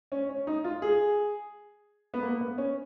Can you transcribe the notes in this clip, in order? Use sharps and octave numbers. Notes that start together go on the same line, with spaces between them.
C#4
C#4
D#4
F4
G#4
B3
A#3
B3
C#4